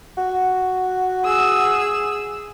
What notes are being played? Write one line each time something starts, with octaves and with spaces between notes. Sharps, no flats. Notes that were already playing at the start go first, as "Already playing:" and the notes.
F#4
G#4 E6